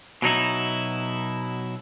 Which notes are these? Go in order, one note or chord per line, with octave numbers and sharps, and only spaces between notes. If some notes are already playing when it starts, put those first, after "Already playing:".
B2 F#3 D#4 E4